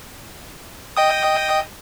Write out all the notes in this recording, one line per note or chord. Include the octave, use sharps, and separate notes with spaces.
D#5 G5 D#6